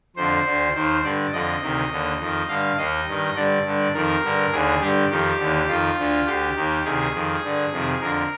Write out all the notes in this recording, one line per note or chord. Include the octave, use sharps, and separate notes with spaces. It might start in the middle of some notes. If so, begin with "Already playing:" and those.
F2 D3 C5
D2 D3
D#2 D#3 C5
G2 D3 D5
F2 D3 D#5
D2 C3 D#3
D#2 D3
F2 D#3
G2 D3 F5
D#2 D#3 D#5
G2 D#3
G2 D3 D5
G2 D3
F2 D#3 A#4
G2 D3
D#2 D3 G#4
G2 D3 G4
F2 D#3 G4
D#2 D3
F2 D#3 F4
D2 D3
D2 D3 G4
D#2 D#3
D2 C3 D#3 G#4
F2 D#3
G2 D3
F2 C3 D#3
F2 D3 A#4